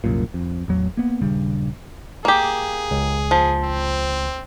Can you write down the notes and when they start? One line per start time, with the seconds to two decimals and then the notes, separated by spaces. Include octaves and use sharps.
0.04 C2 F#2 A#2
0.34 F2
0.68 A1 E2 F#3
0.97 A#3 B3
1.22 D#1 G2 C#3 G3
2.25 A#3 G4 G#4
2.91 C#2
3.31 F3
3.63 C4